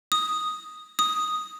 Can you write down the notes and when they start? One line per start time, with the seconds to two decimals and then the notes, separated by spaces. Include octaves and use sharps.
0.12 D#6
0.99 D#6